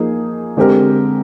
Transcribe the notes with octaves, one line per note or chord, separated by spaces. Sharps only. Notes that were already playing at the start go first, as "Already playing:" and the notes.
Already playing: F3 A#3 D#4 G#4
D3 G#3 C4 G4 A#4